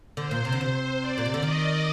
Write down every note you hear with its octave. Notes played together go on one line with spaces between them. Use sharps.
D3 C5
A#2
C3
D3
C3 C5
D5
A#2
C3
D3
D#3 D#5